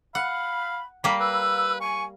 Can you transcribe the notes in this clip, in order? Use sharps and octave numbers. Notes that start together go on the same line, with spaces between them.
F5 F#5 B5
G3 A#3 B5
B4 E6
G#5 C#6